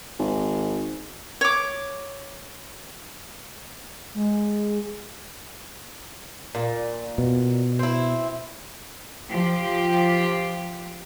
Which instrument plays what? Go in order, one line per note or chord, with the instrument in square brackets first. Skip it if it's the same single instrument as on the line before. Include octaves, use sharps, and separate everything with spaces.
[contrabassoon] G#1
[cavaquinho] C#5 D6
[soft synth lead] G#3
[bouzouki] A#2
[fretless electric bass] B2
[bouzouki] C4 E4
[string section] F3 G4